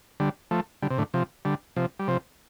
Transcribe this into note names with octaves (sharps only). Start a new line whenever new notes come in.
D3 G3
F3 A3
D3 G3
C3
A2 D3
C3 F3
D3 G3
C3 F3
G3
C3 F3